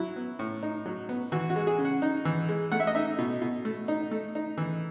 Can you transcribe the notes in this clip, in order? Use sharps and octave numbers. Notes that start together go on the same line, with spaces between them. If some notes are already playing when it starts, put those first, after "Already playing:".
Already playing: F#3 E4
B3
A2
D#4
F#3
B3
E3 F#4
F#4
G#3
G#4
C#3
F#5
D#4
E3
G#3
A3 F#5
E5
D#5
D#4 E5
B2
B2
A3
D#4
A3
D#4
E3